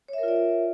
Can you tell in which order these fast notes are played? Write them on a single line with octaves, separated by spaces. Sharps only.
C#5 E5 A#4 F4 D5